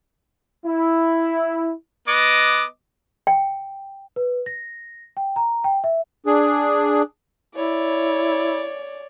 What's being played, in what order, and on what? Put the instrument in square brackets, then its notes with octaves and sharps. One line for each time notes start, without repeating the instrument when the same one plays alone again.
[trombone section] E4
[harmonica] B3 D#5 D6
[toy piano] G5
[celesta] B4
A#6
G5
A#5
G5
E5
[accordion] D4 G#4
[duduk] E4 [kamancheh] C#5 D5